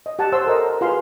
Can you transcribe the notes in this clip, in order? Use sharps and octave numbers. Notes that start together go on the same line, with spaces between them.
D#5
G4 F#5 A5
C5 C#5 F#5 C6 E6
A4 A#4 D#5
A#5
F4 F#4 G#4 B4 F5 C6